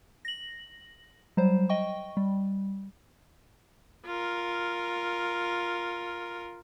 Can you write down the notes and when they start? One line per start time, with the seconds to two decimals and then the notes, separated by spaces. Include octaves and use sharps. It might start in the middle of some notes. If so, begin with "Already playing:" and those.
0.25 A#6 F#7
1.37 F#3 G3 C5
1.69 D#5 G5 C#6
2.17 G3
4.06 F4 A#4